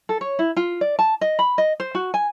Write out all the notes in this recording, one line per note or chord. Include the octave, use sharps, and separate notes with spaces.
A4
C#5
E4
F4
D5
A5
D#5
B5
D#5
C5
F#4
G#5